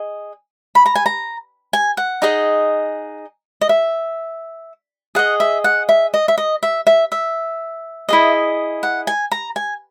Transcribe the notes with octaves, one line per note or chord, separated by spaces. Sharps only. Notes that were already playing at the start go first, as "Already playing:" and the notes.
Already playing: G#4 D#5
B5
A#5
G#5
A#5
G#5
F#5
D#4 G#4 D#5
D#5
E5
G#4 D#5 F#5
E5
F#5
E5
D#5
E5
D#5
E5
E5
E5
E4 G#4 D#5
F#5
G#5
A#5
G#5